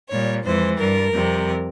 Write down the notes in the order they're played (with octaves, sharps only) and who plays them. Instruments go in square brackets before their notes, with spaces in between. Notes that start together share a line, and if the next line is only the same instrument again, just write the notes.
[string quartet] A#2 G3 C#5
F2 E3 G#3 C5
G2 G3 A#4
F2 C3 G3